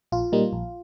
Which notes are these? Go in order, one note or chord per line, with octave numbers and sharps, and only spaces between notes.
A#1 F4
A#2 G3 A#3 D#4
A#1